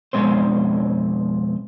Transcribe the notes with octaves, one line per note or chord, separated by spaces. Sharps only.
F2 B2 G#3 C4 C5